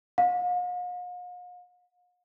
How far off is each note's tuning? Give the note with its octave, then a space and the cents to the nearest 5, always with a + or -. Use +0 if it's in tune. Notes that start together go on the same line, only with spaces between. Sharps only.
F5 +45